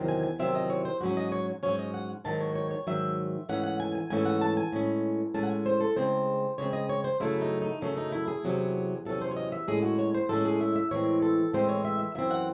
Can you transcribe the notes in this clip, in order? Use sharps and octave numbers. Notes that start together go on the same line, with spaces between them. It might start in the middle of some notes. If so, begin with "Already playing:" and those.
Already playing: E2 C3 D#3 F#3 C4
G#5
G#5
E2 C3 D#3 F#3 C4 E5
D#5
C#5
C5
G#2 F#3 C#4 F#4
D#5
C#5
G#2 F#3 C#4 C#5
D#5
F#5
G#2 D#3 F#3 A5
C#5
C#5
C#5
G#2 D#3 F#3 E5
G#2 E3 A3 C#4 F#5
F#5
G#5
G#5
G#2 E3 A3 C#4 G#5
F#5
A5
G#5
A2 G#3 C#4
A2 G#3 C#4 A5
F#5
G#5
C5
A4
C#3 G#3 C4 C5
C#3 G#3 C4 C#5
D#5
C#5
C5
F#2 C#3 F#3 A3 E4
D#4
D#4
F#2 C#3 F#3 A3 C#4
D#4
E4
G#4
E2 C3 F#3 C#4
E2 C3 F#3 C#4 A4
C5
C#5
D#5
E5
A2 G#3 C#4 G#4
F#4
C#5
C5
A2 G#3 C#4 A4
G#4
E5
E5
A2 E3 G#3 C4 C#5
A4
A2 E3 G#3 C4 C5
C#5
E5
E5
F#2 E3 C4 E5
F#5